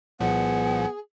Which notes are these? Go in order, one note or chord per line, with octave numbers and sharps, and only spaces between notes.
C2 A#2 F3 B3 G#4 F#5